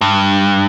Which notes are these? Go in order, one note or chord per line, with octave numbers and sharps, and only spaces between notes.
G2